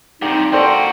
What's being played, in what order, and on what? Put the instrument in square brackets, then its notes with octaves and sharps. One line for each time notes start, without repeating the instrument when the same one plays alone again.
[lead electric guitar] G2 C3 [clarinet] D#4 [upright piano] G4
[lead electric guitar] A#3 F#4 [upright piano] A4 C5 D5 [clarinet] G5